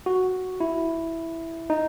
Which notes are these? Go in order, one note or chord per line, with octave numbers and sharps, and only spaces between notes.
F#4
E4
D#4